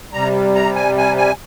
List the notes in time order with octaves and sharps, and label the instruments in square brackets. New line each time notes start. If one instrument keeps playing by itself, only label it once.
[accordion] C3 G3 A#5
A#5
G#5
G#5
G#5